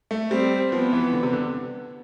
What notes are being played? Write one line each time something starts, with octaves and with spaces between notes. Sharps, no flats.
A3
G3 C4
F3 B3
E3
D3
C3
D3